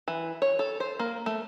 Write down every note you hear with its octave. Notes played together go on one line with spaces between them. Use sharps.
E3
C#5
A4
C5
A#3
A3